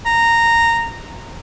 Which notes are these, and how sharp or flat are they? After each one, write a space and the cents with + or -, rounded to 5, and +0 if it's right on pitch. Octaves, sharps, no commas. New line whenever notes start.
A#5 -10